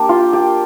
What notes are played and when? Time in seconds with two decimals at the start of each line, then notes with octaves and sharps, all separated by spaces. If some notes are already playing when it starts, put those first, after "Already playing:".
Already playing: A#3 D4 G4
0.09 F4
0.33 G4